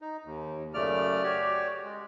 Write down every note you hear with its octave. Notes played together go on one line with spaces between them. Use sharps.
D#4
D#2
F#2 C#3 A3 D5 F6
F#4 G4 C#5 D5
G#3